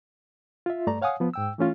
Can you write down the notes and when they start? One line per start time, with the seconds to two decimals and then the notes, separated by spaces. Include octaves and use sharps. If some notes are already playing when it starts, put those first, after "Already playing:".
0.66 F4 E5
0.87 G2 A3 D5 A#5
1.02 C#5 F5 F#5 G#5 D#6
1.20 F3 B3
1.34 G#2 G5 E6
1.58 E3 A3 C#4 F4